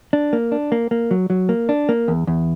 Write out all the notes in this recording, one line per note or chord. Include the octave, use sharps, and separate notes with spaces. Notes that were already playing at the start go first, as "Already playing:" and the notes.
D4
A#3
D4
A#3
A#3
F#3
F#3
A#3
D4
A#3
E2
E2